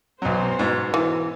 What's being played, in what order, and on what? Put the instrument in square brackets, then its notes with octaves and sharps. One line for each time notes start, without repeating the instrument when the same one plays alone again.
[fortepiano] B1 F#3 [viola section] B3 F#4 C5
[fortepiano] G#2 B2
[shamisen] E3